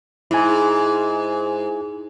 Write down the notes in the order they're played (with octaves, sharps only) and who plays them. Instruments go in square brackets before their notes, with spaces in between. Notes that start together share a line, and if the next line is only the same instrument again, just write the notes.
[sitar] G#2 [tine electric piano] E4 G#5